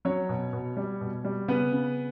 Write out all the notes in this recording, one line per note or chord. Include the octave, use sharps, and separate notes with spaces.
F#3 C#4 C#5
B2
B2
G3
B2
G3
C#3 B3 B4
C#3